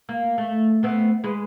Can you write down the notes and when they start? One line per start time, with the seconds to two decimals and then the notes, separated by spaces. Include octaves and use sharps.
0.09 A#3
0.38 A3
0.83 A3 B3 C4
1.24 G#3 B4